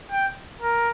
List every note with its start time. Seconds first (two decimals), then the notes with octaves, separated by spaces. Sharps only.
0.12 G5
0.61 A#4